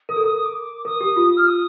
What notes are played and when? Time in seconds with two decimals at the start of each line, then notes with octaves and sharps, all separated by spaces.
0.09 A#4 D#6
0.16 A4
0.24 A#4 D#6
0.35 D#6
0.44 D6
0.85 A#4 D#6
1.01 G4
1.16 F4
1.37 F6
1.47 D#6